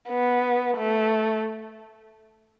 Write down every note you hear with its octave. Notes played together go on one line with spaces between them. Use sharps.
B3
A3